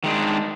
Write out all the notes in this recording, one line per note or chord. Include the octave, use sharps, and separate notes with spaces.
D#3 G#3 D4